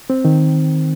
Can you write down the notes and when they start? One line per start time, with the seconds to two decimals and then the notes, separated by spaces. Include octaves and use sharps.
0.10 C4
0.25 D#3